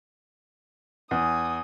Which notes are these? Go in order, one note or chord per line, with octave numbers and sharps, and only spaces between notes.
E2 G#5 D#6